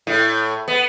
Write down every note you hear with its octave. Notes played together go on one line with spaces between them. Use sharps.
A2
B3